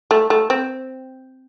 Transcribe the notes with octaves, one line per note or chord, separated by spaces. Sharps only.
A3
A3
C4